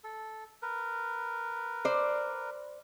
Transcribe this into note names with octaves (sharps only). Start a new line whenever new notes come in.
A4
A#4 B4
C5 D5